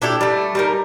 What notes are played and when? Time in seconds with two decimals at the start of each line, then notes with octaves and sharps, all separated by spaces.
0.02 D4 E4 G4 A4
0.21 G3 A3
0.55 G3 D#4 A#4